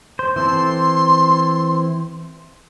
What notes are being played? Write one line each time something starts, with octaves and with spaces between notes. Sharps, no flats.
C5
E3 C4 A4 C6